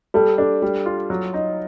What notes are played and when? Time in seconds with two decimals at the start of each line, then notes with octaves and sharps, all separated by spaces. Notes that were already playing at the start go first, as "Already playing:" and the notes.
0.14 G3 A4
0.38 D4 A4
0.62 G3
0.86 F4
1.10 F#3
1.34 D#4